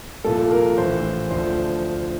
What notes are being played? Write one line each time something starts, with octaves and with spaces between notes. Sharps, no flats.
C2 A#2 F3 A4
A#4
A#1 A2 E3 C5
D2 D3 F3 C5